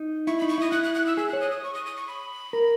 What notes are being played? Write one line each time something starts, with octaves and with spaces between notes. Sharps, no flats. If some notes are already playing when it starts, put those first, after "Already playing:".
Already playing: D#4
E4 C#6
D#4 B5
C#6
E4 D#6
E4 F#6
F#6
F#6
E6
G#4 E6
C#5 F#6
D#6
D#6
C#6
D#6
D#6
C#6
B5
A#4